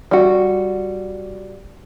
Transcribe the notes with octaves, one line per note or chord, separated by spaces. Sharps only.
G3 F#4